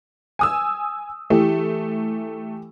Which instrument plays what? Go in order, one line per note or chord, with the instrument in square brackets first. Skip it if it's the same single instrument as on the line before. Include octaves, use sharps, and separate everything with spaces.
[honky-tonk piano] G#5 D#6 E6
[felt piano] E3 G4 [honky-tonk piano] A3